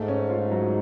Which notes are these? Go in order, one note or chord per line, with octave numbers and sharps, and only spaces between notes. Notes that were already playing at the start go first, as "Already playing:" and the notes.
Already playing: G#2 A3
C#4
F4
F#3